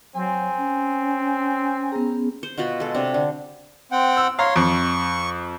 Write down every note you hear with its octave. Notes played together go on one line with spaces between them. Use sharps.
F#3 C4 G#5
C#4
B3 G#4 A#5
C5
B2 F4 F#4 B5
G#3 A4
C3 D4
D3
C4 F#5 G5
E6
C#5 F5 A#5 C6
F2 C#6